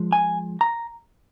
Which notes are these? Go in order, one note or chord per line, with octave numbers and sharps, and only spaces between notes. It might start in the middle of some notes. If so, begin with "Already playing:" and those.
Already playing: F3 G#3
G#5
A#5